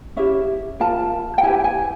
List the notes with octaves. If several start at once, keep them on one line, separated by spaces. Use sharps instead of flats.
C#4 E4 G4 E5
F4 A#4 A5
G5
E4 G4 B4 G#5
G#5